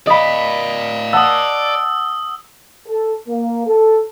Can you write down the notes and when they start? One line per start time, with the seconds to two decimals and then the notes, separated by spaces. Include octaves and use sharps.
0.07 D5 D#5 F5 B5
1.13 F#5 A5 D#6 E6
2.88 A4
3.28 A#3
3.67 A4